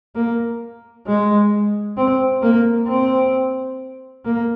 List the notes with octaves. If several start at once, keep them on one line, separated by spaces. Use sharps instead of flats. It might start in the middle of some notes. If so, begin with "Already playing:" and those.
A#3
G#3
C4
A#3
C4
A#3